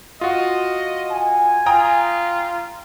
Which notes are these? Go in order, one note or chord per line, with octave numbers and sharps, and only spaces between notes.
F4 F#4 D#5
G#5
F4 G5 A#5 D#6